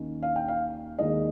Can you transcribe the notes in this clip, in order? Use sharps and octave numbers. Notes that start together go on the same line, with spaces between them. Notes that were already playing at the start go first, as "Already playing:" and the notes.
Already playing: D#2 D#3 A#3 C#4
F5
G5
F5
D#2 D#3 G#3 D#5